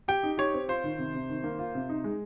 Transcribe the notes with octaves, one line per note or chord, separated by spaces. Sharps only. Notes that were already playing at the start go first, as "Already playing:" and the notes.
G4 G5
D#4
G4 C#5
C4
F4 C5
D#3
C3
C3
D#3
A#3
F4
C3
D#4
G#3